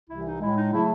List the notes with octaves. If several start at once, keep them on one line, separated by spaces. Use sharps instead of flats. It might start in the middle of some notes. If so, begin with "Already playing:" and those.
C2 C3 E3 E4
D#4
A2 G#3 E4
D#4
C#3 F#3 A3 E4